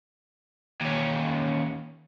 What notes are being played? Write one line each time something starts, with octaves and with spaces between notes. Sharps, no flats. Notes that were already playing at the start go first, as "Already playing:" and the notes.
D#2 C#4